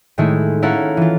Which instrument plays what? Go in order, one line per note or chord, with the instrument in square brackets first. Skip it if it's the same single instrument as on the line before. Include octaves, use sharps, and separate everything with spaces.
[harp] A2 D#3 G#3 A3 E4
C#4 E4 A4 F5 F#5 A#5
E3 F4